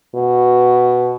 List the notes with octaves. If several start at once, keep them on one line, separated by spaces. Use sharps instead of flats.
B2